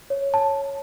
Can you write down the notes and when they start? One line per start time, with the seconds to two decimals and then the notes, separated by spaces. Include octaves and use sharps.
0.10 C#5
0.34 A5